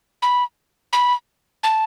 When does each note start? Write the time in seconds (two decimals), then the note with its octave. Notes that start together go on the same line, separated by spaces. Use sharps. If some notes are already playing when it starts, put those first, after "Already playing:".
0.22 B5
0.93 B5
1.63 A5